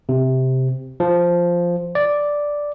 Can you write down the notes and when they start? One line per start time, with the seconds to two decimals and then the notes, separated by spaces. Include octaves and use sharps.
0.09 C3
1.00 F3
1.95 D5